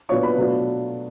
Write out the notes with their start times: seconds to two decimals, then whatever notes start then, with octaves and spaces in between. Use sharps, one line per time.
0.09 A#2 F#3 B3 D4 F4 C#5 C#6
0.23 B4 B5
0.38 B2 F#3 A3 D4 F4